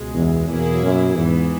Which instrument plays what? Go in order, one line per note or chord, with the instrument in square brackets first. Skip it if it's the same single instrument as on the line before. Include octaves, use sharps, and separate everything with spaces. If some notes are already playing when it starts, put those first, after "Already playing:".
Already playing: [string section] C#2 B2 G#3
[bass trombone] E2
[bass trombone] E2 [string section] B2 F#3 A#3 E4 G#4
[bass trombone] F#2
[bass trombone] E2 [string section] G#2 E3 B3